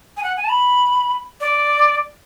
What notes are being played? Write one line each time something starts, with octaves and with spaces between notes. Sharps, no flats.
G#5
F#5
G#5
A5
B5
D5